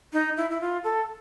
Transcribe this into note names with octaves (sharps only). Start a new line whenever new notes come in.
D#4
E4
E4
F4
A4